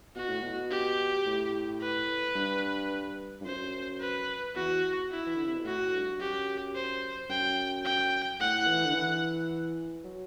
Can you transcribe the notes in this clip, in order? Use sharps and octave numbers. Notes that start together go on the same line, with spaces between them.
B2 F#4
A2
B2
G4
A2
B4
G2
G2
F#2 C5
B4
E2 F#4
E4
E3
D3
C3
B2
A2 F#4
G2
F#2 G4
C5
F#2 G5
G5
A2 F#5
E3
D3
E3
F#3